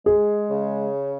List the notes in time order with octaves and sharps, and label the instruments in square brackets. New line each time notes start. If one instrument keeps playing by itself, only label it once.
[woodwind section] G#3 [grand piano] G#4
[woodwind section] C#3